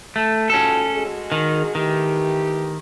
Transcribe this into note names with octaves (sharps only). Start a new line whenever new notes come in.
A3
G#2 C#4 F4 F#4 A4
G#3 F#4 G#4
D#3
D#3 E3 A3 G4